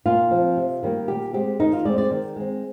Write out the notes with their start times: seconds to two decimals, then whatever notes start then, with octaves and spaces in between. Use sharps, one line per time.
0.05 A#2 F4
0.31 F3 C4
0.57 C3
0.83 D#3 G3 A#3
1.08 A#2 G4
1.33 G#3 C4 G4
1.60 D#3 D#4
1.73 F4
1.85 G#3 C4 D5
1.98 D5
2.11 D#3
2.36 G#3 C4